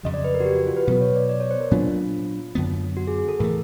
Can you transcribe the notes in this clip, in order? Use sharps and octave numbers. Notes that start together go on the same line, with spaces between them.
F2 C#3 F#3 D#5
D5
B4
A#4
F#4
G4
F#4
F4
B4
B2 F#3 B3 B4
C#5
D5
D5
C#5
C5
A#4
A#2 F#3 B3 D4 F4
F#2 D3 F#3 B3
F#4
G#4
G#4
A4
A2 E3 A3 A#4